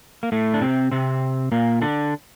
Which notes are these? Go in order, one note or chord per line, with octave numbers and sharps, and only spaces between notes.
A#3
A2 A3
D4
C3 C4
C3 C4
A#2 A#3
D3 D4